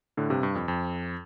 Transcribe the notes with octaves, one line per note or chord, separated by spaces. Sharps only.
A2 D3
G2 C3
G2
F2
F2